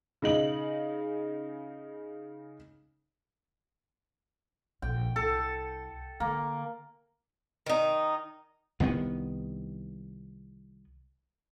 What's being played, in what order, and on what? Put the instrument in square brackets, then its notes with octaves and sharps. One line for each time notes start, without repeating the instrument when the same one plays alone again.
[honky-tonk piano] C#3 D#4 F#7
[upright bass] A#1 [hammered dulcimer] G5
[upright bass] C2 [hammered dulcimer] A4
[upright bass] D3 [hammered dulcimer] A#3
[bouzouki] D#3 D#4
[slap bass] C2 D#3 G#3 B3